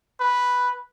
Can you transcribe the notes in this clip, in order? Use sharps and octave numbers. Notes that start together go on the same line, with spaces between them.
B4